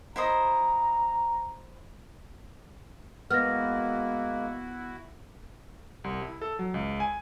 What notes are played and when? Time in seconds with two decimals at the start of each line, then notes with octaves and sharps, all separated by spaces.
0.16 E4 C5 D#5 A#5
3.30 G#3 A#3 B3 E4 F#4 F6 A#6
6.04 C2
6.22 E4
6.41 A4
6.59 F#3
6.74 C#2
7.00 G#5